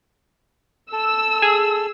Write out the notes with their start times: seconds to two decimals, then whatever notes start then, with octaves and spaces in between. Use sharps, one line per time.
0.92 A4 E6
1.42 G#4